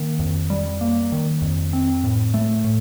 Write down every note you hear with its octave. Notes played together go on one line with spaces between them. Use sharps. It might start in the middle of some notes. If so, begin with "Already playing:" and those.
Already playing: D#3 A#3
F2
G3
A#3
D#3
F2
C4
A2
A3
A2